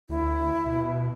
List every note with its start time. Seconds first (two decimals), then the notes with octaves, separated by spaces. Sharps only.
0.09 D2 E4
0.66 B2